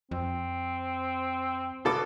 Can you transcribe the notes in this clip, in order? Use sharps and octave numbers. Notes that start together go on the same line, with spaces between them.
F2 C4
B2 A4 D6